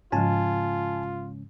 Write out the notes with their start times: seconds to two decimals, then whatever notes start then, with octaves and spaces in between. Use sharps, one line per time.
0.12 G#2 C#3 F3 G#3 C#4 F4 G#5 A5